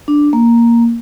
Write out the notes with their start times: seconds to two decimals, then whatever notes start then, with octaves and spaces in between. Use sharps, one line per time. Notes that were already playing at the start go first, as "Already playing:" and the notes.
0.08 D4
0.33 A#3